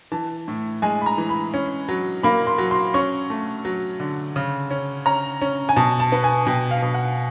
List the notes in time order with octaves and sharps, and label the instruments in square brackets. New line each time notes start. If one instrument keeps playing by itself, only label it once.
[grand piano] E3 A5
A2
G#3 G#5
B5
A#5
E3
B5
C#4
F#3
A#3 B5
C6
F#3
C6
C#4 C#6
A3
F#3
D3
C#3
C#4
C#4 A#5
C#4
G#5
B2 A5
A5
B3
G#5
B2 G5
F5
B2
F#5